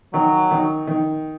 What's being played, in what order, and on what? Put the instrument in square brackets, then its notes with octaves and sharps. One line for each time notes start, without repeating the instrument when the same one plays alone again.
[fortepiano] D#3 [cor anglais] F#3
[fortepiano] D#3
D#3